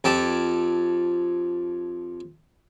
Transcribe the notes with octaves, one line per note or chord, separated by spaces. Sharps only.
F2 G4 A5